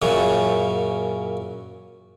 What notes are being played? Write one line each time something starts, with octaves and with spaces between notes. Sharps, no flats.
F#2 A#2 C#3 C#4